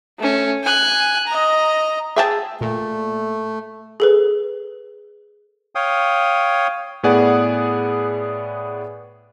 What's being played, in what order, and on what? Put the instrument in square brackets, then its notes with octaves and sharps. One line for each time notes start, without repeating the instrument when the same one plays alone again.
[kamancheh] A3 C#4
G#5 F#6
D#5 A#5
[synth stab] G#4 [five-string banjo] E5 G5 A5
[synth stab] A#2 [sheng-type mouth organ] A3
[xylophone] G#4 A4 B4
[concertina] C#5 F5 G5 D#6
[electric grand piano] A2 B3 G#4 D5 F#5